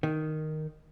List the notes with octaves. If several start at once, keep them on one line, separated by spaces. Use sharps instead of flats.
D#3